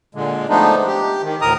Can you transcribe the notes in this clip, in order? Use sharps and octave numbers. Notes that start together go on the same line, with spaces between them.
A#2 D3 G#3
F3 G#3 A3 B3 D4 D#4
G4
D#3
D2 A2 A#4 A#5 D#6